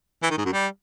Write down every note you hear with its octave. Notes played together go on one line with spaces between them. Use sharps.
E3
D#3
G#2
F#2
G3